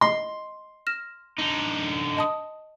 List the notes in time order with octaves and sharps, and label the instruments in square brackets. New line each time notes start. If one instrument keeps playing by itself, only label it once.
[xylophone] D#5 C7 [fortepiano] C6
[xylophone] F6 A#6 E7
[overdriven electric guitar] D3 D#4
[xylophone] D#5 A5 D#6